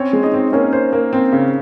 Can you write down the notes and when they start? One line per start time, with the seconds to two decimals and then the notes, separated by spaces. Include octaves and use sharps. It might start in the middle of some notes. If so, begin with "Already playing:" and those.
Already playing: C4 C#4 C#5
0.13 G#3
0.23 D#4 D#5
0.33 C4
0.52 A#3 C#4 C#5
0.73 C5
0.93 A#3
1.13 C4
1.32 C#3